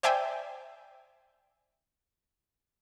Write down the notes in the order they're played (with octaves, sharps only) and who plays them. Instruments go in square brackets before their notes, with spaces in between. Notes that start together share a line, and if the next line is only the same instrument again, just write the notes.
[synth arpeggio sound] C5 D5 E5 G5 G#5